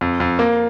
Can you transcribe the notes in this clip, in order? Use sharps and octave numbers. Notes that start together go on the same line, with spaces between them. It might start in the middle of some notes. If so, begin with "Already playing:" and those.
F2
F2
A#3